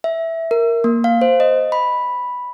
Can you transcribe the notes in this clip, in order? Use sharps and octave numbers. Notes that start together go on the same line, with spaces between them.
E5
A#4
A#3
F5
C5
D#5
B5